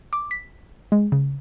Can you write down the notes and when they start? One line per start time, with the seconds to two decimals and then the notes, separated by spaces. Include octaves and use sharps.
0.13 D6
0.31 B6
0.92 G#3
1.12 C#3